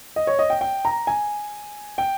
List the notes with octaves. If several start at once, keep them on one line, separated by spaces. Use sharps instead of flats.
D#5
C#5
D#5
G5
G5
A#5
G#5
G5